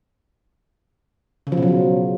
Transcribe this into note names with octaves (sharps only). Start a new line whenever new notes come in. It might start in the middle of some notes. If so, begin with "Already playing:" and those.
C#3
F3
B2
F#3
C#3